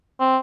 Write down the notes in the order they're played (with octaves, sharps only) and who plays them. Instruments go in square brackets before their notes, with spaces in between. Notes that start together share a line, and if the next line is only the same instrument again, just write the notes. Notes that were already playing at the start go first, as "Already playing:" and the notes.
[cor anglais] C4